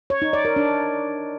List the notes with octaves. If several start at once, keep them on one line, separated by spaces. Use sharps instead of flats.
C#5
D#4
D5
A#4
D4